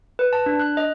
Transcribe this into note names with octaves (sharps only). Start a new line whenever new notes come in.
B4
A5
D4
F#6
D#5